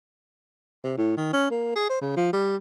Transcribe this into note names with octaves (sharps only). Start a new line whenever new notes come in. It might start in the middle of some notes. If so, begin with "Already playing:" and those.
C3
A2
D#3
C#4
A#3
G#4
C5
C#3
F3
G3